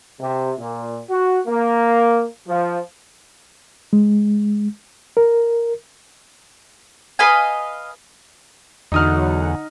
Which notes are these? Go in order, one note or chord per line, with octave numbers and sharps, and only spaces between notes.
C3
A#2
F#4
A#3
F3
G#3
A#4
B4 D#5 F5 G#5
E2 D3 F#3 D#4 F#5 D#6 F6